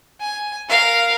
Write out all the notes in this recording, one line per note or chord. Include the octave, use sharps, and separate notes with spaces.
G#5
A#4 F5